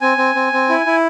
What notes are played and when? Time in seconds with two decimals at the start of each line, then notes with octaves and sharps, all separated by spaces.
0.01 C4 G#5
0.18 C4
0.35 C4
0.53 C4
0.69 E4
0.86 E4